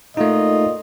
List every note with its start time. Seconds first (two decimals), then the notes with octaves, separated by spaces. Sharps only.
0.17 A#2 A3 D#4 F4 D#5